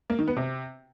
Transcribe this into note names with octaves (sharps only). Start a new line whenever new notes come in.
A#3
D#3
B3
C3